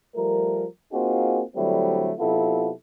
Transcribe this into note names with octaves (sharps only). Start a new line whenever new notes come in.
F3 G3 A3 A#4
A#3 C4 D#4 F4 F#4 G#4
D3 F#3 G3 A3 C4 E4
C3 F#3 B3 E4 F4 A4